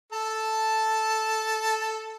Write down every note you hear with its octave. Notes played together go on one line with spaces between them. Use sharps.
A4 A5